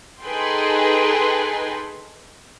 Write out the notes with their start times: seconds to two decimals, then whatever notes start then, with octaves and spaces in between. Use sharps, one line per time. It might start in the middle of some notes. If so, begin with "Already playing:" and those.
0.22 D#4 G#4 A4 B4 G5 C6